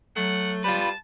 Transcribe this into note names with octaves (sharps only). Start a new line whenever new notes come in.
F#3 A3 F#5
G3 F4 B4 A5